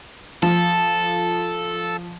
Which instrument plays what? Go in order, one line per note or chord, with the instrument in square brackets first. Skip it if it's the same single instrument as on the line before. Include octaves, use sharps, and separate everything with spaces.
[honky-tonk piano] F3 [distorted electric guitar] A4